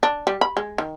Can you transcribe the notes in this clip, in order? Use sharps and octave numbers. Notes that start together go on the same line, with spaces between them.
D4
G3
B5
G#3
D#3